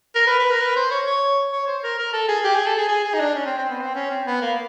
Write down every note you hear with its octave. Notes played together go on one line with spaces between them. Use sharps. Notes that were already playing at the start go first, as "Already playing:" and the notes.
A#4
B4
B4
A#4
B4
C5
C#5
C#5
C#5
C5
A#4
A#4
A4
G#4
G4
G#4
A4
G#4
G#4
G#4
D#4
D4
C#4
C4
C4
B3
C4
C#4
C4
B3
A#3